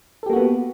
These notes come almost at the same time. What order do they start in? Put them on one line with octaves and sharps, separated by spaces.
A4 G4 A#3 F#4 B3